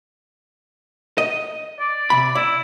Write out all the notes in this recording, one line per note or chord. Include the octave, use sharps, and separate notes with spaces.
D#5
D5
C3 B5
E4 D5